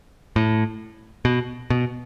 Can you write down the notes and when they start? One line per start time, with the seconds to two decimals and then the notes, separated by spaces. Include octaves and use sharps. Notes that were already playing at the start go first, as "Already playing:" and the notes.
0.36 A2
1.25 B2
1.70 B2